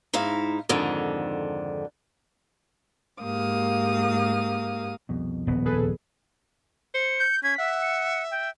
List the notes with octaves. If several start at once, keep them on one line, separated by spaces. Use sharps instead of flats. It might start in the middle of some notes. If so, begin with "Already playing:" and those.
G#2 D#4 E4 F5
F2 G#2 D3 D#3
G#2 A#3 G4 F5 D#6
C2 F2 B2
D#1 B3
G#4 A4 B4
C5 C#7
G6
C#4 G#6 B6
E5 F#5
C#7
G5